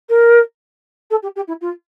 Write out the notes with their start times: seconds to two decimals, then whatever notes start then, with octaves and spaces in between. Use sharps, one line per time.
0.09 A#4
1.11 A4
1.23 G4
1.36 G4
1.48 E4
1.61 F4